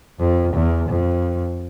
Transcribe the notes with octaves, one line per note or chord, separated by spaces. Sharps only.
F2
E2
F2